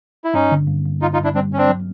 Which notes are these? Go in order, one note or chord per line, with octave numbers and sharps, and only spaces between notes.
E4
G2 C#4 D#4
D3
G2
G2
G2 D#4 F4
D#4 F4
G2
D4 E4
G3 C4 D4
G2 C#4
C4 D4
F#3